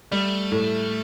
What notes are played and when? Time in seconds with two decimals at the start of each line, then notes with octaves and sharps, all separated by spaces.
0.12 G3 A3
0.52 A2